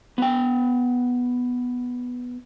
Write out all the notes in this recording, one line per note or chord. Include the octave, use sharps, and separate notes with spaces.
B3 G5